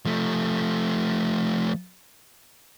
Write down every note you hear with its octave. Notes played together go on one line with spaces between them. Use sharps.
F3 A3